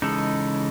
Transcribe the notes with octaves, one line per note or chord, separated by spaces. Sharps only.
C#3 E3 G#3 D#4 A4